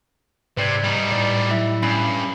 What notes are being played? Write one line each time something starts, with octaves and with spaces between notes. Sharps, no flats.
G#2 C3 B4 D5 G#6
G3 D#4
A2 D5
E4 E5
G2 C#4 G#5 B5